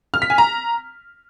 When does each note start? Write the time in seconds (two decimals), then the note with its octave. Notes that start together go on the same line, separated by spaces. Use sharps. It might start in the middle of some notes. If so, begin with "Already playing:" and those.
0.14 F6
0.22 B6
0.30 G#5
0.38 A#5